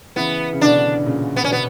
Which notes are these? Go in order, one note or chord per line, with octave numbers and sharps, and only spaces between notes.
C#3 E3 B3
C#3
B2 D3 D4
A#2 C#3
B3
C#4
B2 B3